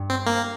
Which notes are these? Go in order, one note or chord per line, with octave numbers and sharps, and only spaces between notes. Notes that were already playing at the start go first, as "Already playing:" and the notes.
Already playing: G2
C4
A#3